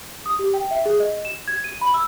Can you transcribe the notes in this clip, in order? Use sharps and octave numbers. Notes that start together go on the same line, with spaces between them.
D#6
G4
G5
E5
G#4
D#5
E7
G#6
D#7
B5
E6